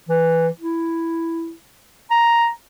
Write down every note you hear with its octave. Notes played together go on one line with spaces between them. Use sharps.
E3
E4
A#5